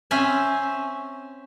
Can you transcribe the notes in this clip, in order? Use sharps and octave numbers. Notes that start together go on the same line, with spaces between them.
C4 C#4 E5 G#5